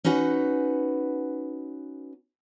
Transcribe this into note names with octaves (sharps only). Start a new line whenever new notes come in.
C#4 D#4 F#4 B4 F#5